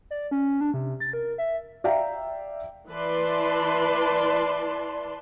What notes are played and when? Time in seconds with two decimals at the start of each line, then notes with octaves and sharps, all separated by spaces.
0.11 D5
0.31 C#4
0.61 D4
0.74 C3
1.00 A6
1.13 A#4
1.38 E5
1.84 D5 E5 F5 G5 A#5
2.90 E3 B4 D5 A5 C6